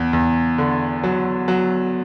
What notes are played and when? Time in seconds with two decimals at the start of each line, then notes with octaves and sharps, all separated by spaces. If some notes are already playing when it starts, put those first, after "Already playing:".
Already playing: E2
0.13 E2
0.58 D3
1.03 F#3
1.48 F#3